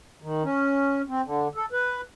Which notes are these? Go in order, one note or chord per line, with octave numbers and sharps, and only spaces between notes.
D#3
C#4
C4
D3
A4
B4